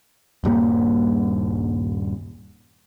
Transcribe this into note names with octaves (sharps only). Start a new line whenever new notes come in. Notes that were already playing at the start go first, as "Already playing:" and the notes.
D#1 G2 G3 A#3